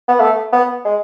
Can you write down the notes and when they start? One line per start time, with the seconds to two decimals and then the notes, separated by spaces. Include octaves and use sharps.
0.08 B3
0.21 A3
0.53 B3
0.85 G#3